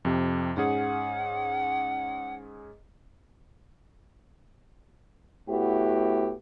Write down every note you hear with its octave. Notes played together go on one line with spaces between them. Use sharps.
F2 C3
G#2 C#4 G#4 F#5
A2 B3 E4 F#4 G4